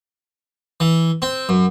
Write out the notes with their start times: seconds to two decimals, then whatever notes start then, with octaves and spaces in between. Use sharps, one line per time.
0.80 E3
1.22 C4
1.49 F#2